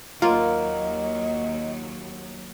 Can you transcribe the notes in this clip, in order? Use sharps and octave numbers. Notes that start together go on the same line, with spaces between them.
D#2 F#3 A#3 F4 D#5